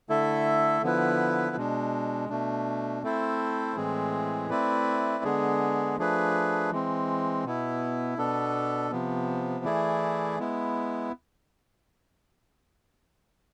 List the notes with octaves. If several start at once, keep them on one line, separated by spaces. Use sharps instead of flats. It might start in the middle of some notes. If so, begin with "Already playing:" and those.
D3 A3 E4 A4 E5
D3 F3 B3 E4 B4
B2 G#3 D4
B2 A3 D4
A3 C4 E4 A4 C5
A2 E3 G#3 C4 G#4
A3 C4 E4 B4 D5
D3 G#3 B3 D4 G#4
F3 A3 D4 G#4 B4
E3 G#3 C4
B2 B3 E4
B2 B3 D4 A4
C3 F3 B3
E3 A3 E4 G#4 D5
G#3 B3 E4